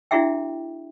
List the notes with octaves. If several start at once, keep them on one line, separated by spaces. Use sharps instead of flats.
D4 E4 F#4 G#4 E5 G5